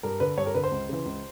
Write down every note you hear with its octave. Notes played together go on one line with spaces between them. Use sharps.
G2 A#4
D3 B4
G2 C#5
A#4
D3 B4
C5
C#2
C#3 E3
C#2